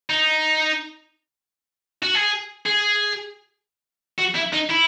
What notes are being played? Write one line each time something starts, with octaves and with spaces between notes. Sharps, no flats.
D#4
F#4
G#4
G#4
F#4
E4
D#4
E4